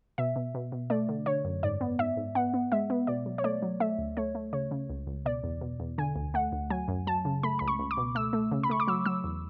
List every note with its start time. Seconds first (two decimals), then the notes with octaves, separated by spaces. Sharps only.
0.18 B2 E5
0.36 B2
0.55 B2
0.72 B2
0.90 A3 D5
1.09 D3
1.26 D3 C#5
1.45 F#2
1.63 G#2 D5
1.81 B3
1.99 G#2 E5
2.17 G#2
2.35 B3 F#5
2.54 B3
2.72 G#3 E5
2.90 B3
3.07 B2 D5
3.26 F#3
3.38 C#5
3.44 A3 D5
3.62 F#3
3.80 A3 E5
3.98 D2
4.17 A3 C#5
4.35 A3
4.53 C#3 C#5
4.71 C#3
4.90 C#2
5.07 C#2
5.26 B2 D5
5.44 E2
5.61 B2
5.80 E2
5.98 D3 G#5
6.16 D2
6.34 A3 F#5
6.53 D2
6.70 F#3 G#5
6.88 F#2
7.07 F#3 A5
7.25 C#3
7.43 A3 B5
7.59 C#2 B5
7.68 C#6
7.79 C#2
7.91 D6
7.97 B2
8.15 A3 E6
8.33 A3
8.52 C#3
8.63 B5
8.70 A3 C#6
8.80 D6
8.88 F#3 E6
9.06 F#3 E6
9.24 E2